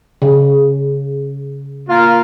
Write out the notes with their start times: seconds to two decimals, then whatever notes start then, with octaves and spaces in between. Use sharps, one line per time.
0.22 C#3
1.89 A#3 F4